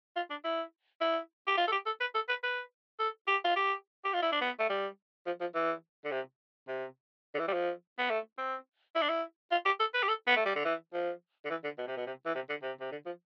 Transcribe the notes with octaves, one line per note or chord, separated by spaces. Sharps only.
F4
D4
E4
E4
G4
F4
A4
G4
A4
B4
A4
B4
B4
A4
G4
F4
G4
G4
F4
E4
D4
B3
A3
G3
F3
F3
E3
D3
C3
C3
D3
E3
G3
F3
B3
A3
C4
E4
D4
E4
F4
G4
A4
B4
G4
A4
B3
A3
G3
D3
E3
F3
D3
E3
D3
B2
C3
B2
C3
E3
C3
D3
C3
C3
D3
F3